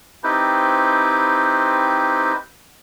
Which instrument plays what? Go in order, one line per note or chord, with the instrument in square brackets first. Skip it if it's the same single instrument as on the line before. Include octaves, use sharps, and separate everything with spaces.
[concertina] C4 D#4 E4 G4 B4 C5